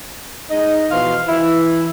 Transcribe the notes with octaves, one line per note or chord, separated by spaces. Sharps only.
G#3 D#4 D#5
B2 E3 F3 F5 C6
E3 E4